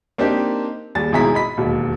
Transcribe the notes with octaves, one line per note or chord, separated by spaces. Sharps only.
A#3 C4 D4 D#4 G4
D#2 G3 G#4 A6
G#1 B2 E4 G#4 A#5 B6
D#5 B5 B6
E1 D#2